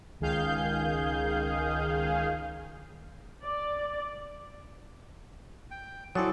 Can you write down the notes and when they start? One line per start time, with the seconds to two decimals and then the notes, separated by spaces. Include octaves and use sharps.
0.20 C#2 D#3 G#4 F5 G6
3.44 D5
5.71 G5
6.15 F#3 C4 E4 A4 D5 G#5 D#6